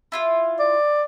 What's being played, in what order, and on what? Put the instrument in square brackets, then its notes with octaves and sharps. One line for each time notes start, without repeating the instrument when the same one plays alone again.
[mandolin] E4 F4 F5
[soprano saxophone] D5